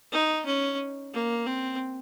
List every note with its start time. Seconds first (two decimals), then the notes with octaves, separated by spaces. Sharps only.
0.12 D#4
0.46 C#4
1.14 A#3
1.46 C4